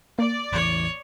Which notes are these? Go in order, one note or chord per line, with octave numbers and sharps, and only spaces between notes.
A#3 D5
A1 E2 E3 C#5